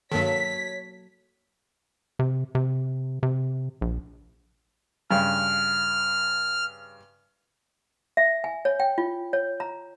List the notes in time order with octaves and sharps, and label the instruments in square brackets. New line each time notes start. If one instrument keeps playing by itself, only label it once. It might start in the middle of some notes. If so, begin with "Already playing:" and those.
[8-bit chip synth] G2 D#3 [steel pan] F#3 A#3 A4 [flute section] C#5 [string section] B6
[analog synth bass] C3
C3
C3
A#1
[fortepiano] G2 C#3 [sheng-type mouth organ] F6
[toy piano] E5
G#5
C#5
G5
F4
C#5
A#5